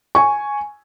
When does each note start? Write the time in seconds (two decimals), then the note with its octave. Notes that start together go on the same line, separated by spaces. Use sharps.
0.15 G#5 C#6